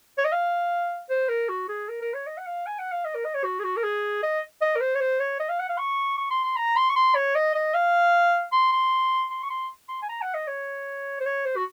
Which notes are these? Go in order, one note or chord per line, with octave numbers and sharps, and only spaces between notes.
C#5
D#5
F5
C5
A#4
F#4
G#4
A#4
A#4
C#5
D#5
F#5
F5
G#5
F#5
F5
D#5
A#4
D#5
C#5
F#4
G#4
F#4
A#4
G#4
D#5
D#5
A#4
C5
C#5
C5
C#5
D#5
F5
F#5
F5
C#6
C#6
C6
C6
A#5
C6
C#6
C6
C#5
D#5
D#5
F5
C6
C6
C6
C#6
C6
C6
G#5
A#5
F#5
D#5
C#5
C5
C#5
C5
F#4